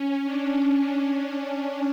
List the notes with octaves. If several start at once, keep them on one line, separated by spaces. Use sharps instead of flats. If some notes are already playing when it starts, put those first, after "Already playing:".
Already playing: C#4
D4